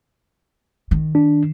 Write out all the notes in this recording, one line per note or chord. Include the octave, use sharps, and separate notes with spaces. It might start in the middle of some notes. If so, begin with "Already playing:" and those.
D#3
D4